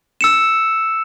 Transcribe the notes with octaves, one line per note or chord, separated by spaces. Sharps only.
E6 C#7 E7